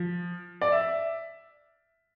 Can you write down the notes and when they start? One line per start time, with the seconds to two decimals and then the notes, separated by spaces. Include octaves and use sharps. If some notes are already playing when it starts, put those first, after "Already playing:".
Already playing: F3
0.61 D5
0.72 E5